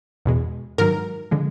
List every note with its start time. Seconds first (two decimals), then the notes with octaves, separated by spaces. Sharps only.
0.25 E2 B2 G#3
0.78 G#2 D#3 F#3 A#4
1.31 D3 F3 G#3